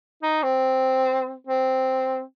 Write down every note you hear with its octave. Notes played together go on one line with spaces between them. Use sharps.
D#4
C4
C4